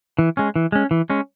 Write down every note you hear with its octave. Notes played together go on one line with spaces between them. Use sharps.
E3
G#3 C#4
E3
G#3 C#4
E3
G#3 C#4